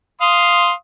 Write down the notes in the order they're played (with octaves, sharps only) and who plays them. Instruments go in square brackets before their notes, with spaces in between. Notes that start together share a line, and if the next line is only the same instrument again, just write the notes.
[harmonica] F5 C6 D#6